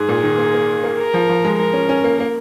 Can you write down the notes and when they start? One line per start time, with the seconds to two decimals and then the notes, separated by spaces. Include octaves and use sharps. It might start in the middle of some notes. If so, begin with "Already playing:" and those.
Already playing: G#2 G#4
0.09 A#2
0.23 D#3
0.38 A#3
0.54 A#3
0.84 A#3
0.99 A#4
1.14 F3
1.29 F3
1.44 G#3
1.59 G#3 A#4
1.73 C#4
1.89 C#4
2.04 A#3
2.20 A#3